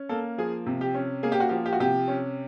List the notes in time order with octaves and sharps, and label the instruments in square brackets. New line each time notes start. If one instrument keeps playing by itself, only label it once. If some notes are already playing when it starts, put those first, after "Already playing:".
Already playing: [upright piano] C#4
A#3 A4
F3 G#4
C3
G4
C#4
A#3 G#4
G4
F#4
F3 G4
G4
F#4
C3 G4
C#4